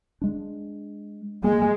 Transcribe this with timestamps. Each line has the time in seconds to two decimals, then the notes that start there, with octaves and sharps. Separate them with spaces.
0.22 G#3 D4
1.44 G#3 A#3